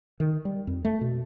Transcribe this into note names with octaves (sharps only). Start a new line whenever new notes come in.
D#3
G3
F2
A3
B2